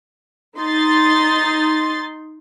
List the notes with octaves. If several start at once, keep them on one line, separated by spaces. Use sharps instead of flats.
D#4 C6 A6